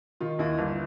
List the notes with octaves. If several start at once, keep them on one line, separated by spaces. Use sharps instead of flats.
D#3 F4
D#2 E4
G1